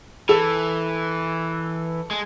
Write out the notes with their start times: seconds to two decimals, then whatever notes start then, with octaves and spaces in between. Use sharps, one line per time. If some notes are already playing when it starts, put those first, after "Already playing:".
0.29 E3 A4
2.11 G#3